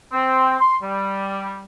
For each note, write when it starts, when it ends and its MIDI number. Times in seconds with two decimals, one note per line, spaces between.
0.13 0.55 60
0.60 0.77 84
0.83 1.63 55